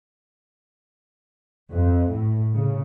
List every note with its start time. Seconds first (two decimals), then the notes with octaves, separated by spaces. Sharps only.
1.70 F2
2.11 A2
2.53 C#3